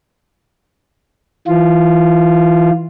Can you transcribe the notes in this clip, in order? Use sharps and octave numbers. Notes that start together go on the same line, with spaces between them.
E3 F4